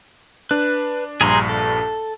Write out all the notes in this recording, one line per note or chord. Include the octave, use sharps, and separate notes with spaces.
D4 B4
A#1 G2 G#4 A#5 C6
A4